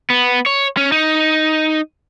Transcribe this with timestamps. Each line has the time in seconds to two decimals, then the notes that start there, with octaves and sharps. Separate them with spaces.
0.10 B3
0.46 C#5
0.77 C#4
0.92 D#4